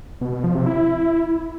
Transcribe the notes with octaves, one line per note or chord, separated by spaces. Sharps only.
B2
B2
F3
C3
E4